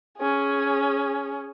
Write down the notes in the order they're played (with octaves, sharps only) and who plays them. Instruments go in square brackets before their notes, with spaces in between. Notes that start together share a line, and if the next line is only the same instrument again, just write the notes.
[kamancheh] C#4 G#4